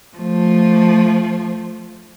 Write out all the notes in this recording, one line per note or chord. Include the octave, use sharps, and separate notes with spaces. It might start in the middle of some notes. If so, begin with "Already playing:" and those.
F3 A3